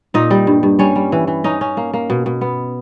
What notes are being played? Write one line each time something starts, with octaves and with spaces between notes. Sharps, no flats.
A#2 D#4 D#5
G3
G2
G2
G3 C#4 C#5
G3
E3
E3
C#4 D#4 D#5
C#4
A#3
A#3
B2
B2
B3